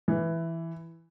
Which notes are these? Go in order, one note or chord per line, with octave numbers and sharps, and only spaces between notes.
E3